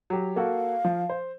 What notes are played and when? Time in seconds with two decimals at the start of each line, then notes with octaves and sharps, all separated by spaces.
0.10 F#3 G4
0.36 A#3 F#4 A4 F5
0.85 F3
1.09 C5